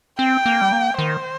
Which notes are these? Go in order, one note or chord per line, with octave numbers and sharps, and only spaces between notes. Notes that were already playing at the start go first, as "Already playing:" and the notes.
C4 G5
A#3
G3
A#3
D#3 C5